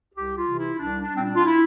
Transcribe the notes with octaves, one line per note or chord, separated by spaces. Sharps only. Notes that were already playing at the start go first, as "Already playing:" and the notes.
C2 G4
F4
C3 E3
E4
C2 D4
D4
A#2 G3 C4
D4
F4
E4